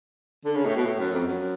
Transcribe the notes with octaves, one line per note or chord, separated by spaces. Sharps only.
D3
C#3
A2
B2
A2
F#2
F2
F#2